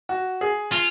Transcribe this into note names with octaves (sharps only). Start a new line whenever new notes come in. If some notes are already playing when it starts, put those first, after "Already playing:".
F#4
G#4
F4